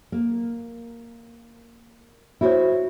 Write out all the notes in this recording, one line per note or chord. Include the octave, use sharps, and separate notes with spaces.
A#3
E4 F#4 C5 C#5